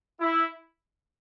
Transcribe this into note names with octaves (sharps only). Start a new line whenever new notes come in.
E4